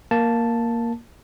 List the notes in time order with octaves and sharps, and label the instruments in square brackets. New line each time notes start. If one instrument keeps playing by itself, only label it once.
[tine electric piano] A#3 A5